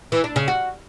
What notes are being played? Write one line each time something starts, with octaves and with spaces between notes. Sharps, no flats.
E3
D4
C#3
F#4